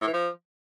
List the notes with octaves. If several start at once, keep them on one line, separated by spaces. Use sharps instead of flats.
A2
E3
F3